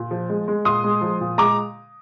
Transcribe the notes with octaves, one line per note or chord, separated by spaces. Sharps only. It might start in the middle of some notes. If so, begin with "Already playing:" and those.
Already playing: A#2
F3
G#3
G#3
A#2 C6 D#6
G#3
F3
A#2
G#3 A#5 D6